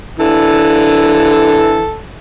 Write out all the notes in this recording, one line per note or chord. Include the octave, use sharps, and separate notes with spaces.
D3 E3 A4